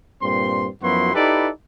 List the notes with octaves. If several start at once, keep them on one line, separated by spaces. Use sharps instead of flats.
G2 A#2 C4 C6
F#2 F3 B3 E4 F#4 C6
D#4 E4 G4 A4 B4 D5